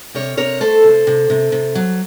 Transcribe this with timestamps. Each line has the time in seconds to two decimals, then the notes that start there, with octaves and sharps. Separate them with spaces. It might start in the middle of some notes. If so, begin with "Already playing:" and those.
0.15 C3 A#4 C#5
0.37 C3 A#4 C#5
0.61 A3 A4 C5
0.84 C3
1.07 C3
1.30 C3
1.52 C3
1.75 F#3